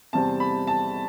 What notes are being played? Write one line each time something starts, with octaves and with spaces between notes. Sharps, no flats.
E2 C3 G3 C4 A5
B5
A5